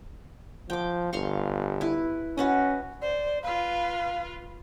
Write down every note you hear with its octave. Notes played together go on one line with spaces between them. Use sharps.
F3 G5 D6
G1 F5 C6 C#6
E4 B4
C#4 F#4 B4 D#5
C5 D5
F4 B4 F5